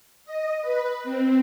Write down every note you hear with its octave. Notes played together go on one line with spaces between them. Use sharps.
D#5
B4
C4